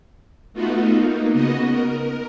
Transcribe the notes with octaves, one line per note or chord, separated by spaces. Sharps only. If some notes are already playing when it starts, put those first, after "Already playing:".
A3 B3 D#4 F4 F#4
A#3 D#4
C#3 B3 F#4 D#5
A#4